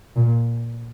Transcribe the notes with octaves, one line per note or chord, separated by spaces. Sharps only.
A#2